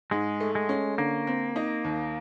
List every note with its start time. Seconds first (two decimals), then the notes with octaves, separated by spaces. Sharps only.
0.11 G#2 G#3
0.40 A3
0.55 G#3
0.69 C#4
0.98 D3 A#3
1.27 C4
1.56 D#4
1.85 D#2